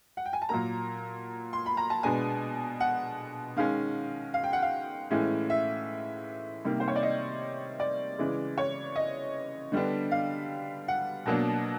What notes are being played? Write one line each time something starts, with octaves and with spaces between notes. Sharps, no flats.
F#5
G5
G#5
A5
A#2 F#3 A#3 A#5
C6
B5
A#5
A5
B2 G#3 B3 D4 G#5
F#5
D#3 G#3 C#4 F5
F5
G5
F#5
F5
A2 E3 G#3 C#4
E5
C3 D#3 G3 A#3
C5
C#5
D5
D#5
D5
C#3 E3 G#3
C#5
D#5
D3 G3 B3 D4
F5
F#5
B2 F#3 A#3 D4